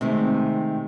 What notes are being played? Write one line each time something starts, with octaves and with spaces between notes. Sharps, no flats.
C3 D#3 G#3 A3